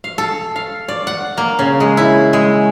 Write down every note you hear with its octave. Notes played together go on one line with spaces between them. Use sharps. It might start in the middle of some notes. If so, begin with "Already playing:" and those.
F5
A4
F5
D5
F#5
A#3
C#3
G#3
E4
G#3